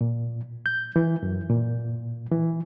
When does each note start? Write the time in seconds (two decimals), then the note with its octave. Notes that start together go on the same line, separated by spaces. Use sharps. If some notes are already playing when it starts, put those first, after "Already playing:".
0.01 A#2
0.66 G6
0.96 E3
1.23 F#2
1.50 A#2
2.32 E3